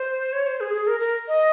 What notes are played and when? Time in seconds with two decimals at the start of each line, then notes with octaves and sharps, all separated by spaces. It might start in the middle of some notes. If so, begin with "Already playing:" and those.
Already playing: C5
0.33 C#5
0.47 C5
0.61 G#4
0.74 G#4
0.87 A#4
1.00 A#4
1.28 D#5